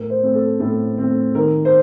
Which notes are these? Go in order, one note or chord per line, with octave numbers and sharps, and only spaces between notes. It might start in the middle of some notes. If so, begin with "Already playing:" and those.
Already playing: A2 A#4
C5
A3 C4
A4
A2 A4
A3 C4
D#3 A#4
C5